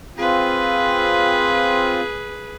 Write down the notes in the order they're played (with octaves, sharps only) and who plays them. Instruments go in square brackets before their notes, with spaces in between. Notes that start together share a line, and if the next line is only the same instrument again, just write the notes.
[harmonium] C4 F4 [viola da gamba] G#4 B4